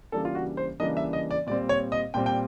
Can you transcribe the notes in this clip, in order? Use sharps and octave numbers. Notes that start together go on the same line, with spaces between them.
C#3 E3 G3 A#3 D4 A4
F4
F#4
C5
C#3 E3 G3 A#3 D4 D#5
E5
D#5
D5
A#2 G3 C4 D5
C#5
D#5
A#2 G3 C4 G5
G5